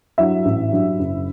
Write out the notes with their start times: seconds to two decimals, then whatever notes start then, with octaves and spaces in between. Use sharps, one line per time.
0.18 G2 F#3 E4 E5
0.45 A1
0.71 G2 F#3
0.99 F#1